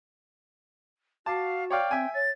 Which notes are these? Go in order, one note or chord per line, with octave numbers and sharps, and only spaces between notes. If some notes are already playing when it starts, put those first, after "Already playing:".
F#4 F5 A5 D6
C#5 D5 F5 G5
C4 E5 G#5
C#5 A6